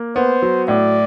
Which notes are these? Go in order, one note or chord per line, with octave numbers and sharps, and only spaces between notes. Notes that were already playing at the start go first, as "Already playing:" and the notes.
Already playing: A#3
B3 C5
F#3
A2 D5